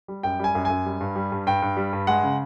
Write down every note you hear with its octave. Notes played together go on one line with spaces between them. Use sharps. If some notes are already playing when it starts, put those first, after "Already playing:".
G3
F#2 G5
G3 G#5
F#2
F#2 G#5
G3
G2
G3
G2
G2 G5
G2
G3
G2
G#3 F#5
C#3